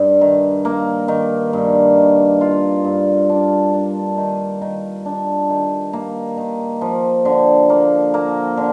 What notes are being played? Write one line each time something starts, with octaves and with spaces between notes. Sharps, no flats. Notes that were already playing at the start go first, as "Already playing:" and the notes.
Already playing: G2
D#3
A#3
D#3
G2
D#3
F4
G2
D4
D4
D#3
D#3
D4
D#3
A#3
D#3
F3
D3
A#3
A#3
D3